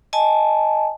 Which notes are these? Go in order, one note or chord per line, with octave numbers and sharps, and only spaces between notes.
D#5 G#5 A5